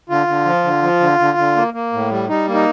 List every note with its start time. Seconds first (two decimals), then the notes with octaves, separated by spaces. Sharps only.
0.09 D3 F4
0.27 D3
0.45 F3
0.64 D3
0.83 F3
1.00 D3
1.19 D3
1.38 D3
1.56 A#3
1.74 A#3
1.93 A2
2.11 G3
2.29 G3 D#4
2.48 A#3
2.54 D#4